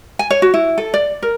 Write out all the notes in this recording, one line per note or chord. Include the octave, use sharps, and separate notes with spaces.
G#5
C#5
F#4
E4
A4
D5
A#4